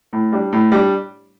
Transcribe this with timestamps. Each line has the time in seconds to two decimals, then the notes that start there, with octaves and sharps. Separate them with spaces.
0.13 A2
0.32 G3 D4
0.53 A2
0.72 G3 D4